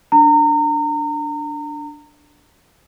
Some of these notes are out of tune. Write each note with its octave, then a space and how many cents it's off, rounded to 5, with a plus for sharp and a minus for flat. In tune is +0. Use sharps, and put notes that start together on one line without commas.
D4 +0 A#5 -30